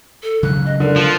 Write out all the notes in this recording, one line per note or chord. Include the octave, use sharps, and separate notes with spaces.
A4
C#3 F#3 G#3 F#6
D#5
D3 A#4
F3